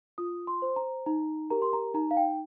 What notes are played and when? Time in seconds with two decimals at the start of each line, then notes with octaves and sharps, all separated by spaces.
0.18 F4 D#6
0.47 C6
0.62 C5
0.76 A#5
1.06 D#4 A#5
1.50 G4 A#4 A#5
1.62 C6
1.73 A#5
1.94 D#4 A#5
2.11 F5
2.17 G5